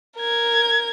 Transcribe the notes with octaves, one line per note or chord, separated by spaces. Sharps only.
A#4 G#6